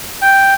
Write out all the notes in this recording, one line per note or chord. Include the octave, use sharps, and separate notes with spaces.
G5